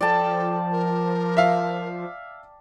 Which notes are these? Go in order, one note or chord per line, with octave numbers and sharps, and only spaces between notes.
F3 A4 D5 G5 A5
A#4
E5 F5